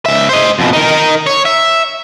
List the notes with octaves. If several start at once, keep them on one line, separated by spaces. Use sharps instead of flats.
C#2 E5
C5 D#5
F2 B2
D#4 A#4
C#5
E5